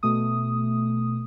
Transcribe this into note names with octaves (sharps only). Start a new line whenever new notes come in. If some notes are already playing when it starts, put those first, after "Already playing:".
B2 A3 D#6